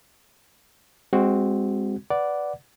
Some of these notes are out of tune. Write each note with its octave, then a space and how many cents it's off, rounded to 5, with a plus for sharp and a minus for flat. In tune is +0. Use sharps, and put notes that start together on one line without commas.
G#3 -25 C4 +0 F#4 +0
B4 +0 D5 -5 F#5 +0